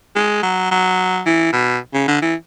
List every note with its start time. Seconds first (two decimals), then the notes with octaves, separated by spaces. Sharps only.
0.16 G#3
0.43 F#3
0.71 F#3
1.26 E3
1.53 B2
1.94 C#3
2.08 D3
2.22 E3